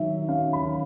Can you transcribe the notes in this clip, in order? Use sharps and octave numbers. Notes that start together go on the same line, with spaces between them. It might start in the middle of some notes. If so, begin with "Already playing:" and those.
Already playing: D#3 F#3 E5
C#4 F5
B5
D#3